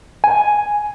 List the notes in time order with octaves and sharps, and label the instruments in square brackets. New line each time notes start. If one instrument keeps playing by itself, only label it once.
[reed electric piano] G#5